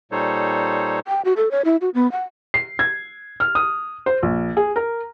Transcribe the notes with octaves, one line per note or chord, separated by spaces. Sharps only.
A#2 G3 D#4 A4 C5 C#5
G5
F#4
A4
C#5
E4
F#4
B3
F#5
C7
G#6
F6
D#6
C5
A#1
G#4
A#4